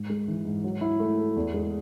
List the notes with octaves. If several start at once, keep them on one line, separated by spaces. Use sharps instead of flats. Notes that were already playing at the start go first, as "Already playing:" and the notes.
Already playing: G#2
G#3
E3
G#2
F#3
E4
A3
A4
E2
G#3